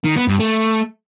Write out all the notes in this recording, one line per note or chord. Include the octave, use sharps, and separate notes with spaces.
D#3
B3
G2
A3